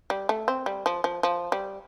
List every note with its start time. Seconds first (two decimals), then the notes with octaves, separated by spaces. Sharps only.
0.10 G3
0.29 A3
0.48 C4
0.66 G3
0.86 F3
1.04 F3
1.23 F3
1.52 G3